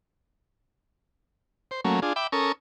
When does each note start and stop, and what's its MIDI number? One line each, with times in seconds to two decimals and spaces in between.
1.71 1.81 72
1.85 2.00 54
1.85 2.00 57
1.85 2.00 58
1.85 2.00 61
2.02 2.13 62
2.02 2.13 65
2.02 2.13 68
2.16 2.27 76
2.16 2.27 79
2.16 2.27 83
2.16 2.27 86
2.32 2.52 61
2.32 2.52 69
2.32 2.52 70
2.32 2.52 85
2.32 2.52 87